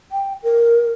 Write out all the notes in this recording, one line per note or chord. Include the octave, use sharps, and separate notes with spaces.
G5
A#4